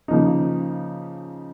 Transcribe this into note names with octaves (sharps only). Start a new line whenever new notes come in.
C#3 F3 A#3 D#4